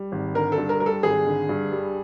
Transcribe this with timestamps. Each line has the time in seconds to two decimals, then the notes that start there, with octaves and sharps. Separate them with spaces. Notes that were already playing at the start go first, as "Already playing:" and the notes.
Already playing: G3
0.12 G#1
0.35 D3 A#4
0.52 A4
0.57 G2
0.69 A#4
0.80 G3 A#4
0.86 A4
1.03 G#1 G#4
1.26 D3
1.49 G2
1.72 G3